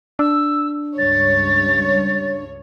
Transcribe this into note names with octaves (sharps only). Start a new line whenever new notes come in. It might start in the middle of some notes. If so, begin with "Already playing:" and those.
D4 E6
C#2 G2 C#5 A6